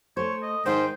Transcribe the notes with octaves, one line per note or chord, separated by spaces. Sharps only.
A3 C5 C#5
D#5
G#2 D#3 D#4 C5 G5